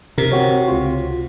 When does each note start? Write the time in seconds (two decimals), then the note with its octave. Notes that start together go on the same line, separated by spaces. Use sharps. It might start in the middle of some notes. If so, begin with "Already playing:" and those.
0.18 C3 A#4
0.32 C4 F#4 C#5
0.68 C#2 F4